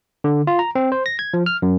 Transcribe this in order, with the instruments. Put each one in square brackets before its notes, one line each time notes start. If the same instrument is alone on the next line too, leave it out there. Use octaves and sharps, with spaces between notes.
[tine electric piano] D3
F4
A#5
C4
C5
A#6
G#6
F3
F6
F#2